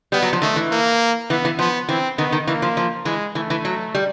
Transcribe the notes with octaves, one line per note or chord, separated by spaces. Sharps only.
G3 B3
F#3
F3
D#3 A3
E3
A#3
E3 B3
E3
F3 B3
E3 C4
D#3 B3
D#3
E3 A#3
F3
F3
E3 G#3
E3 A3
E3
F#3
G3